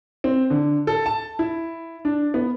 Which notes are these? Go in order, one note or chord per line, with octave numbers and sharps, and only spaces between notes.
C4
D3
A4
A5
E4
D4
B3